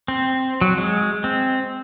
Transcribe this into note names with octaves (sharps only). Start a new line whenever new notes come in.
C4
F#3
G#3
C4